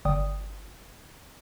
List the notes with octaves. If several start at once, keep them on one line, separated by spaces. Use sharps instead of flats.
G1 D5 G5 D#6